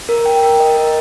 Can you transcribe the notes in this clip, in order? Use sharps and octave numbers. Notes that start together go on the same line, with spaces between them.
A#4
G5
A#4
D#5
A#4